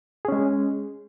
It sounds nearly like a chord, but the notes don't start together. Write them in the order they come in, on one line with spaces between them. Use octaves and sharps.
G#4 C#4 G#3